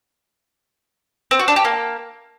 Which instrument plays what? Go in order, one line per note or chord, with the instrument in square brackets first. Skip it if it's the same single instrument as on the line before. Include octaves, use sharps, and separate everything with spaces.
[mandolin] C4
F#4
D4
G4
A#3